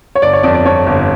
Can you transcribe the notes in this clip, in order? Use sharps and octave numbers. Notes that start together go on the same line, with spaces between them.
C#5
G1 D5
C#5
F2 D5
D5
F2 C#5
G1